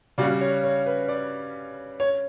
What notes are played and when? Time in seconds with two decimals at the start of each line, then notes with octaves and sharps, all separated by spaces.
0.18 C#3 G3 C#4 F#4 D5
0.41 C#5
0.64 C#5
0.86 B4
1.09 D5
2.00 C#5